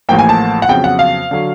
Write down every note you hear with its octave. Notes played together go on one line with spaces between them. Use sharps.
A1 A2 F3 A#3 G5
G#5
A5
F#5
F2 C#3 F#3 B3 G5
F#5
F5
D3 F#3